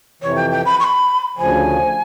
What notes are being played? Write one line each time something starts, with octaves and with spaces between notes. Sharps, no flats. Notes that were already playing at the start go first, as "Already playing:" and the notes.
F2 C3 E3 C#5
G5
G5
B5
C#6
B5
D2 C#3 F3 G#5